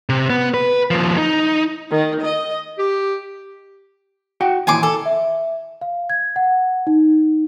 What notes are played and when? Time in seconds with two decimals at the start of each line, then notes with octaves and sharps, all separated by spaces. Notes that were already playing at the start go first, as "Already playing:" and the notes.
0.09 C3
0.30 B3
0.54 B4
0.91 D#2 F3
1.18 D#4
1.90 D#3
2.21 D#5
2.79 G4
4.41 F#4 F#5 G5
4.67 D#2 A#2 E3 G#5 C6 D6
4.83 A4
5.06 E5
5.81 F5
6.10 G#6
6.36 F#5
6.87 D#4